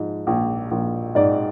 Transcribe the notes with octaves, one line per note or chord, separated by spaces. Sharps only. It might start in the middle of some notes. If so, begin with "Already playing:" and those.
Already playing: G#2 F3
A#1
A#1
G#2 D5